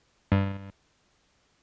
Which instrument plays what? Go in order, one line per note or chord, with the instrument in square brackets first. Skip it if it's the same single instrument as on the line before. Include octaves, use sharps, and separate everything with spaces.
[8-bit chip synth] G2